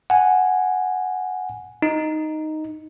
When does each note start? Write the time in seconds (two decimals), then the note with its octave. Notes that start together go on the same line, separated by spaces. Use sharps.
0.10 F#5 G#5
1.82 D#4